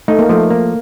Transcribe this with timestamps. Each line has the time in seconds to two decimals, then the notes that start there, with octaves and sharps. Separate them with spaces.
0.08 A3 D#4
0.19 A#3
0.29 F3 A3
0.50 A#3